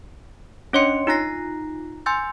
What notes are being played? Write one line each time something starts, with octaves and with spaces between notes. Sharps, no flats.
C#4 D4 C#5 D#5 C6 C#7
D#4 F4 A#5 F#6 A#6 C7
G#5 C6 E6 G6 A6